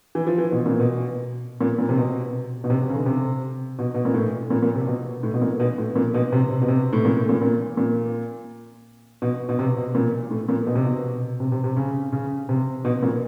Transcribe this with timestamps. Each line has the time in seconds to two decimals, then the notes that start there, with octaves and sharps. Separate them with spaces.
0.15 E3
0.27 F3
0.38 E3
0.52 B2
0.66 A#2
0.80 B2
1.61 A#2
1.78 A#2
1.89 C3
1.97 B2
2.64 B2
2.70 C3
2.82 C3
2.89 C#3
2.94 D3
3.06 C3
3.79 B2
3.94 B2
4.05 A#2
4.14 A2
4.50 A#2
4.62 A#2
4.75 C3
4.87 B2
5.23 A2
5.34 B2
5.42 A#2
5.60 B2
5.78 A2
5.96 A#2
6.14 B2
6.32 C3
6.50 C3
6.62 B2
6.68 C3
6.93 A2
7.05 A#2
7.17 A2
7.29 A#2
7.41 A#2
7.77 A#2
9.22 B2
9.49 B2
9.59 C3
9.77 B2
9.95 A#2
10.31 A2
10.49 A#2
10.67 B2
10.75 C3
10.85 B2
11.40 C3
11.52 C3
11.64 C3
11.76 C#3
12.12 C#3
12.49 C3
12.85 B2
13.03 A#2